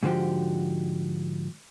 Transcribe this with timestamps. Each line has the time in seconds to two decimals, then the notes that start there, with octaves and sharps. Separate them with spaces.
0.03 G#2 D3 F3 F#4 G4